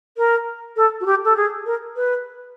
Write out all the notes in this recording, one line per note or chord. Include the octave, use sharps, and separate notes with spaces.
A#4
A4
F#4
G4
A4
G#4
A#4
B4